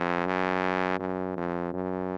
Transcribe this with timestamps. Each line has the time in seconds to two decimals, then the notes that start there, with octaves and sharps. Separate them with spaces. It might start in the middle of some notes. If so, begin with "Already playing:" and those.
Already playing: F2
0.26 F#2
0.99 F#2
1.37 F2
1.73 F#2